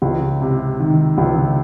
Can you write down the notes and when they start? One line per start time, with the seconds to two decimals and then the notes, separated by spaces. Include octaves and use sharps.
0.02 C#2
0.42 C3
0.80 D#3
1.18 C#2